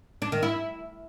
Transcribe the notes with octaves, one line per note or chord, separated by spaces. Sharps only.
D4
D#3
E4